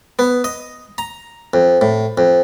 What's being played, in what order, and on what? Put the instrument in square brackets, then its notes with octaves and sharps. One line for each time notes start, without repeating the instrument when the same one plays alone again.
[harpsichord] B3
D#5
A#5
F2
A2
F2